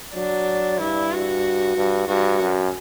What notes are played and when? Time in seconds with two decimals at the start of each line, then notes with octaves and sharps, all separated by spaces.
0.15 F#3 D4
0.80 G2 E4
1.12 F#4
1.77 G2
2.08 G2 F#4
2.41 F#2